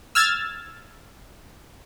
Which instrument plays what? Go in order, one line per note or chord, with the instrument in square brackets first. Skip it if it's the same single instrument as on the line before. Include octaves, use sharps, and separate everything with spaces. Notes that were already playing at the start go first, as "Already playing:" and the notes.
[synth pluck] E6 F6 G#6 A6